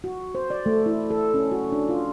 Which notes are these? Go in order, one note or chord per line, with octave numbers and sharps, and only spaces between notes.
F#4
C5
D5
A3
E4
A4
C#4
F#4
D4
F4